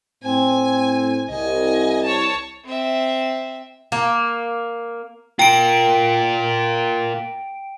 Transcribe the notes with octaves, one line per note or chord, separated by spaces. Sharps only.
A2 C4 G#5
C2 D#5 G#5
C#5 A5
C4 E5
A#3
F4 A#4 G5 D7